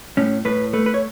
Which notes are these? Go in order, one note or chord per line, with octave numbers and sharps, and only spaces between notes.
A2 C#4
A2 B4
A3 B4
B4
C#5